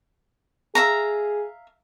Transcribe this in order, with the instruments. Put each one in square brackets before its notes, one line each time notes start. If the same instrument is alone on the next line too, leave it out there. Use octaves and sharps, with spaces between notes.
[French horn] G#4 [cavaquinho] E5 F5 A#5